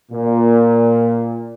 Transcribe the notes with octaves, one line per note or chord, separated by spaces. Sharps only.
A#2